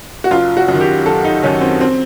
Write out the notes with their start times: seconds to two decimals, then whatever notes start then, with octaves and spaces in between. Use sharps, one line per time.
0.24 F#4
0.31 F#1 F4
0.57 F#4
0.68 F#2 D#3
0.81 G4
1.06 F#1 A4
1.24 D#4
1.43 F#2 D#3 C#4
1.61 C4
1.81 C4